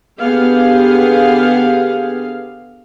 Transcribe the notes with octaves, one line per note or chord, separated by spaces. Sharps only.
D3 B3 G4 G#4 F5